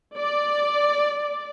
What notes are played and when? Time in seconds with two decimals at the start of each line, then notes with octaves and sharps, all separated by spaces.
0.16 D5